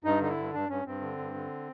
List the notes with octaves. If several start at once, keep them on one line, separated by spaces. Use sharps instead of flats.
G2 D#4
D3 D#4
E4
G2
G2 D4
G2 C#4
G2 C4
D3
G2
D3